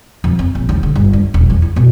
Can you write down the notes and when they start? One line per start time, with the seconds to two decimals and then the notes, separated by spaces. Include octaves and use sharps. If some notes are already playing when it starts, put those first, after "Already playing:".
0.24 F2
0.39 C4
0.55 A#1
0.69 D#2
0.83 D3
0.95 G1
1.13 D4
1.34 D#1
1.50 E2
1.62 E4
1.76 B2